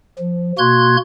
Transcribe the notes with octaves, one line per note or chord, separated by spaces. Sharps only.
F3
B2 A#3 F#4 C6 F#6 G#6